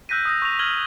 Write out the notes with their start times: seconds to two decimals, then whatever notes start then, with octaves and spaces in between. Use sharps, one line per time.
0.09 E6 F#6 G6 A#6 B6 D#7
0.25 D#6 E6 A#6
0.42 C#6 A#6 F7
0.59 F6 G#6 F#7 G7